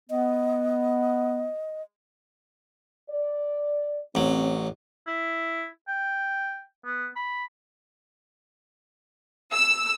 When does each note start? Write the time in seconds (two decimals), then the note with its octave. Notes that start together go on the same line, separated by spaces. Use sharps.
0.10 B3 D#5
3.10 D5
4.15 A1 F#3 C4
5.07 E4
5.88 G5
6.85 B3
7.16 B5
9.53 E6